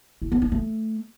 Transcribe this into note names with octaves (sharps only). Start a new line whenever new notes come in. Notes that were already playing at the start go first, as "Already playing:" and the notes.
E4
B3
D#4
A3